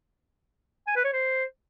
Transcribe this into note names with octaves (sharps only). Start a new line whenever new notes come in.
G#5
B4
C#5
C5